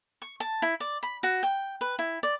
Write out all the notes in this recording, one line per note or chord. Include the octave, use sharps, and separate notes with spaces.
C#6
A5
E4
D5
B5
F#4
G5
B4
E4
D5